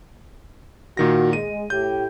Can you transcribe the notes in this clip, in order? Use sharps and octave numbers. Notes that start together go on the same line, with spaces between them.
A#2 D#3 F#4 A#6
G#3 D#7
A2 G4 G6